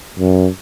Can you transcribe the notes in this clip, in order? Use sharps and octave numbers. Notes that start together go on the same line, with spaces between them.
F#2